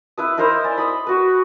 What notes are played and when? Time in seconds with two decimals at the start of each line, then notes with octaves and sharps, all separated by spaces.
0.18 E4 B4 D#6
0.37 D#4 E4 A#4 C5
0.64 D5 G#5
0.77 B5 D#6
1.07 F#4 B4